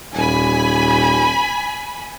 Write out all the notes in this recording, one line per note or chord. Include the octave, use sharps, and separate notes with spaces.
D#1 G#5 B5